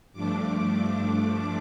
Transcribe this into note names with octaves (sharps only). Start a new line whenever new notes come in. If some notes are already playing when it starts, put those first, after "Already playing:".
G2 F3 A3 D4 D6
D6